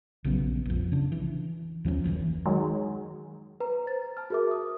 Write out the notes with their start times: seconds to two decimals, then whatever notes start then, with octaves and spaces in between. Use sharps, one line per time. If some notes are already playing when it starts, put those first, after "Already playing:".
0.24 A#1 C#3 F#3 B3
0.66 A#1 F2
0.92 C#3 D4
1.12 E3
1.85 D#2 F3 G3 C#4
2.04 F#1 F#2 A#2 E3
2.46 D#3 F#3 G#3
3.60 B4 A#5
3.86 C5 A6
4.17 A5 F6
4.30 F#4 G#4 A#4 E5 D6
4.51 D#6